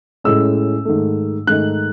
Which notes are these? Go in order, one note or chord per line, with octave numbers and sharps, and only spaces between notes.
A2 G#3 C#4 E6
G#2 D#3 A3
G#2 D#3 A3 D#4 F#6